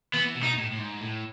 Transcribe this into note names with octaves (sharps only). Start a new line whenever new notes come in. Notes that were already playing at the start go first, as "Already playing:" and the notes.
E3 B3
B2
D#4
A2
A2
G#2
A2